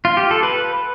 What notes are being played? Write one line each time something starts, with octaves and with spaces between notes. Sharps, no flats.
F4
G4
A4
B4